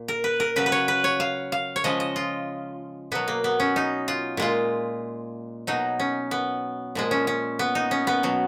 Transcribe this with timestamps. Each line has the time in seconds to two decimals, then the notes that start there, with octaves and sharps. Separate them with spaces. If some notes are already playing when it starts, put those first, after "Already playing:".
Already playing: A#2
0.08 A#4
0.24 B4
0.40 A#4
0.56 C#3 F#3 B4
0.66 B4
0.72 C#5
0.88 B4
1.04 C#5
1.20 F5
1.52 F5
1.76 C#5
1.84 C#3 F3 G#3 D#5
2.00 D#5
2.16 F4
3.12 B2 F#3 B3
3.28 A#3
3.44 B3
3.60 C#4
3.76 D#4
4.08 F4
4.37 A#2 G#3 F4
5.67 B2 F#3 D#4
5.99 C#4
6.31 B3
6.95 A#2 F3 G#3
7.11 C#4
7.27 C#4
7.59 B3
7.75 D#4
7.91 C#4
8.07 B3
8.23 B2 F#3